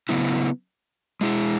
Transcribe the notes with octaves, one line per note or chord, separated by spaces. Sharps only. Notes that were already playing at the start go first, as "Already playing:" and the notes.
C#3 F#3 B3 E4
G#3 E4 G#4